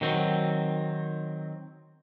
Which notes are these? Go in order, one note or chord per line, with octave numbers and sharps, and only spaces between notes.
D#3 F#3 C4